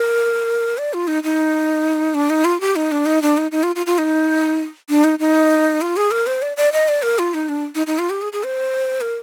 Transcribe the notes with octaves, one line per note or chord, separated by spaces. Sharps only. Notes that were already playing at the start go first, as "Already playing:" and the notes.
Already playing: A#4
D5
F4
D#4
D#4
D4
D#4
F4
G4
D#4
D4
D#4
D4
D#4
D#4
F4
F4
F4
D#4
D4
D#4
D#4
F4
G#4
A#4
C5
D5
D5
D#5
D5
A#4
F4
D#4
D4
D#4
D#4
F4
G4
G#4
G#4
C5
A#4